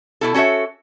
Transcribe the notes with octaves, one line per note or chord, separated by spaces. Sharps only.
B2 E4 A4
C#4 F#4 A4 C#5 E5